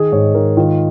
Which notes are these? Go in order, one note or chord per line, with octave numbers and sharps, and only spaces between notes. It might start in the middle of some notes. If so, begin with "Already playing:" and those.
Already playing: D#3 G#4
G#2 C#5
D#3 A#4
D#3 F4